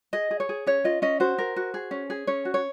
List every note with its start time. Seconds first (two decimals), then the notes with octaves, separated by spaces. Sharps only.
0.13 G#4 D#5
0.31 G#4
0.40 C#5
0.49 G#4
0.67 C#4 C#5
0.84 F4 D#5
1.02 C#4 D#5
1.20 F#4 C5
1.38 A#4
1.56 F#4
1.74 G#4
1.91 C#4
2.10 G#4
2.27 C#4 C#5
2.45 F#4
2.54 C#5